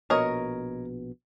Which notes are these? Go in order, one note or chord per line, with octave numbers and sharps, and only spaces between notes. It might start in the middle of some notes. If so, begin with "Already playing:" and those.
A#1 B2 A#4 C#5 D#5